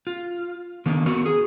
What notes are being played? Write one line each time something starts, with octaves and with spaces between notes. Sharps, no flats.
F4
D3 D#3 A#3 B3
B3 F#4 A#4
G#4